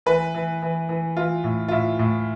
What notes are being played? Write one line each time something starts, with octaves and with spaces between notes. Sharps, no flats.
E3 B4
E3
E3
E3
E3 F4
A2
F4
A2 E4
A2